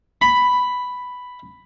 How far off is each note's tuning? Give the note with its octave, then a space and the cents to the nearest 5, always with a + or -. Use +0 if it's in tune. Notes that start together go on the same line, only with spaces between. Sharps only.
B5 +5